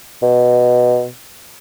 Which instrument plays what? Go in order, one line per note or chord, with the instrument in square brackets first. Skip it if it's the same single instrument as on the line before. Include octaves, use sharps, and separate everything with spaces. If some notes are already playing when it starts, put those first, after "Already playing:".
[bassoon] B2